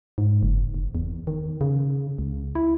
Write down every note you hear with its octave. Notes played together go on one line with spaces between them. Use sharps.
G#2
F#1
F#1
E2
D#3
C#3
C#2
E4